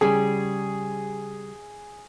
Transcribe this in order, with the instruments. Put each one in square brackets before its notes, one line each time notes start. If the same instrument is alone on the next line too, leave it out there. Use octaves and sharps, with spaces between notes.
[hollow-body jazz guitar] C#3 G3 [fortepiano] G#4